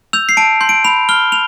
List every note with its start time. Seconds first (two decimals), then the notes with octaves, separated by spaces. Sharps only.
0.13 E6 G6 F7
0.29 C7
0.37 A5 D7
0.61 C6 G6
0.69 D7
0.84 B5 F7
1.09 F6 G7
1.32 F7